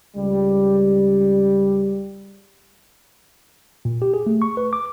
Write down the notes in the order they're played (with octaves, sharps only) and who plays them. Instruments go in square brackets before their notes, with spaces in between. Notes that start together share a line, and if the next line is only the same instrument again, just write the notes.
[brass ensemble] C#2 G3
[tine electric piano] A#2
G4
G#4
A3
C#6
B4
D6